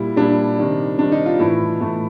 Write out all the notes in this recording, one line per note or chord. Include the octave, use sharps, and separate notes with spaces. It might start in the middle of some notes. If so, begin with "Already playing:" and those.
Already playing: A#2 G3 E4
A#2 G3 D4
C3 D#3 G3
C3 D#3 G3 D4
D#4
F4
A2 E3 A3 E4
A2 E3 A3